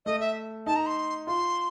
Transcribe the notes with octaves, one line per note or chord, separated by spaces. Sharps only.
A3 D#5
E5
D#4 A5
A#5
C6
F4 C6